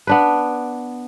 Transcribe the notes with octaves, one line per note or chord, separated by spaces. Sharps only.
B3 D4 B4